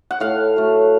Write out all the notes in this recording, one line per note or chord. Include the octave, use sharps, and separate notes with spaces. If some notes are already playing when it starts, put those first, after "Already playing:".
F#5
A2 F5
F#3 A3